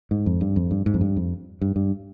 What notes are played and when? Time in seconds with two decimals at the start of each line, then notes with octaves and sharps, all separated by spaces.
0.11 G#2
0.26 F2
0.41 G2
0.56 F2
0.71 G2
0.86 G#2
0.94 F2
1.01 G2
1.16 F2
1.61 G2
1.76 G2